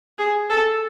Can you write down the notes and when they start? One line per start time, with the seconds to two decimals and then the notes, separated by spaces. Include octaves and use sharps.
0.18 G#4
0.50 A4